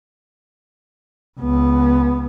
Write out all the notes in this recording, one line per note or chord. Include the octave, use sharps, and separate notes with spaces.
C#2 B3